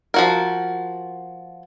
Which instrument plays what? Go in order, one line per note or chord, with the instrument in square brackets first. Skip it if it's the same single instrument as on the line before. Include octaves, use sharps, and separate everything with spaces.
[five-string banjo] F3 F#4 A#4